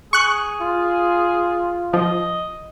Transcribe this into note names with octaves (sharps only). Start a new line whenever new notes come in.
G#4 C#6 F#6
F4
F3 D#5